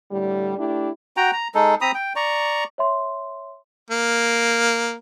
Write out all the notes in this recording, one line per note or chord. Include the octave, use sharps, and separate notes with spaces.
A2 D3 G3
A3 D4 E4 G4
F#4 G5 A#5
A#5
G#3 D#4 A4
C4 A#5 B5 D#6
G5
D5 A#5 C#6
C#5 E5 C6
A#3